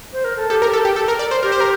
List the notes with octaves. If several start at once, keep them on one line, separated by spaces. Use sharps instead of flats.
C5
A#4
A4
G4 A4
A#4
A4
G4
A4
A#4
D5
C5
G4 A#4
C5
A#4